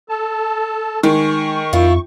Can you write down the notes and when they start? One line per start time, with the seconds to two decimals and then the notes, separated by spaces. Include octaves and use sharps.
0.09 A4 A5
1.03 D#3 G#3 C#6
1.73 F2 E4 F4